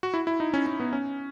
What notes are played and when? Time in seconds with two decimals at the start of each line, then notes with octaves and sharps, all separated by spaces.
0.03 F#4
0.14 E4
0.27 E4
0.40 D#4
0.54 C#4
0.67 C#4
0.80 B3
0.93 C#4